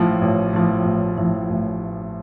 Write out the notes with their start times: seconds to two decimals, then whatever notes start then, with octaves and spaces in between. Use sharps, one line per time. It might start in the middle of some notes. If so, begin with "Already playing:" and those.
Already playing: A1 A2 F3
0.21 A1
0.53 A2 F3
0.85 A1
1.17 A2 F3
1.49 A1